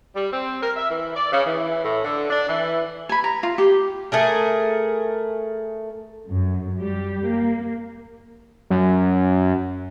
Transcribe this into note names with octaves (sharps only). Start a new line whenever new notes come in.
G3
C4
A#4
E5
E3
D5
C#3
E3
A2
D3
D4
E3
G#5 B5
A#5
F4
G4
A3 G#4 A#4
F#2
G3 G4
A#3
F#2